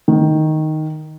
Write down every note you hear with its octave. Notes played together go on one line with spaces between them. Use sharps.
D#3